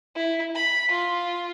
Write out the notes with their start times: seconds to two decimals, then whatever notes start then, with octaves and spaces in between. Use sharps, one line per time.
0.16 E4
0.55 B5
0.91 F4